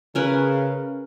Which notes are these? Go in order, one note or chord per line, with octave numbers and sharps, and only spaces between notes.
C#3 C#4 A#4 B4